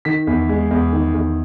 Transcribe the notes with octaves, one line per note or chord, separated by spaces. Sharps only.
D#3 B6
E2
G#3
E2
D#3
E2